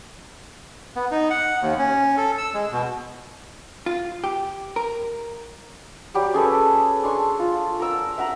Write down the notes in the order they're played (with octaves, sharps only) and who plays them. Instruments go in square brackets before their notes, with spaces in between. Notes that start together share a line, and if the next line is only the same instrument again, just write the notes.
[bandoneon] B3
D#4
F#5
D#2
C#4
A4
E6
G#3
B2
[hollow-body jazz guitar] F4
G4
A#4
[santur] F#3 G3 G4
C#4 G#4 A4 B4
D4 C6 C#6
F4
A#4 E6
E5 F#5 A#5